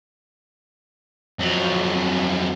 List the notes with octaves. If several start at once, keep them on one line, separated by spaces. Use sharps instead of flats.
F2 F#3